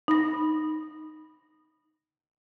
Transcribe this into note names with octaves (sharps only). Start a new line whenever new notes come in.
D#4 B5 A#6